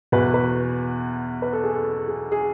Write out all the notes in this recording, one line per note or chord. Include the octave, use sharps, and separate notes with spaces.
E2 B2 B4
B4
B4
A4
G#4
A4
G#4
G#4